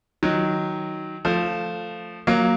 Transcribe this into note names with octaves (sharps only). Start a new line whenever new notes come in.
D#3 F#3
F3 A3
F#3 A#3